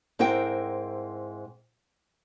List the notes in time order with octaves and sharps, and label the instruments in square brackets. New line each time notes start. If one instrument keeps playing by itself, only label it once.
[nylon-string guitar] G#2 C4 E4 A#4 G5